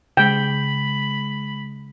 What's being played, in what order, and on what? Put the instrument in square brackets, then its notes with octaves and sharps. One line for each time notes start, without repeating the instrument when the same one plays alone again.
[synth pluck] C#3 G#3 [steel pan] G5 [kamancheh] B5